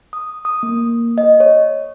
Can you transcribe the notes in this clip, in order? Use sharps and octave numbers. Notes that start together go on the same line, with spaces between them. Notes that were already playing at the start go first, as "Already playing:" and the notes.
D#6
D#6
A#3
D#5
C#5